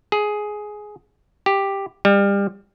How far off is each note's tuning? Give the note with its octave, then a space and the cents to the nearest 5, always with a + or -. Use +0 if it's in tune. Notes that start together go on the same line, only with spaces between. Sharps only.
G#4 +10
G4 +5
G3 +30